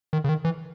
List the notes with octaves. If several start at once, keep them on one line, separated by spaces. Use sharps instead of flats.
D#3
C#3
D#3
E3